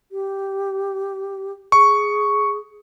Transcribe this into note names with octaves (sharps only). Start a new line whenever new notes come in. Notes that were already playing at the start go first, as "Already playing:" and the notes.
G4
G#4 C#6